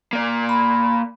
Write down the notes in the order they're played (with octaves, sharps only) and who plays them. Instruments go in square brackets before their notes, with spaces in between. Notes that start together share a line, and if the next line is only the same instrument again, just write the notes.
[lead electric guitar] A#3 D5
[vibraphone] B5